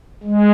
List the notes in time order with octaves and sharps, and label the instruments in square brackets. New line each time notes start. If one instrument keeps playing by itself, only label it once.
[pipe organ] G#3